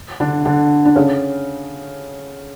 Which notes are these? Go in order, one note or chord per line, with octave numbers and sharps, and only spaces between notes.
D3 D4
D3 D4
D4
C#3 C#4